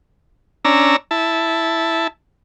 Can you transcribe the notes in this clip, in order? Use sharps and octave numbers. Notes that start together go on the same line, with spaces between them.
C#4 D4 A#5 E6
E4 A5